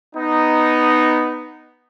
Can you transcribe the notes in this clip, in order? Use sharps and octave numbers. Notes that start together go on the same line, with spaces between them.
B3 D#4